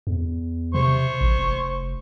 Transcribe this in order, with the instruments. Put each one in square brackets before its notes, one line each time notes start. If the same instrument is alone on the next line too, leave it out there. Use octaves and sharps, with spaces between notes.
[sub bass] E2
[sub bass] C3 [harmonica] C5 C#6
[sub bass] A1
F1